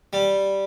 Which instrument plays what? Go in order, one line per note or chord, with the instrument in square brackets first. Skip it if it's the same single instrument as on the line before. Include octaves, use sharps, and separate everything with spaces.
[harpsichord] G3